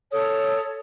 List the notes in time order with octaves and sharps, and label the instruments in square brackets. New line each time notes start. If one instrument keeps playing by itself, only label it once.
[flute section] A4 C#5 D#6